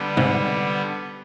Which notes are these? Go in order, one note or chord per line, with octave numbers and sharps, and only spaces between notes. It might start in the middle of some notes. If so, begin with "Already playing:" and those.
Already playing: D3 G3 B3
G#2 C3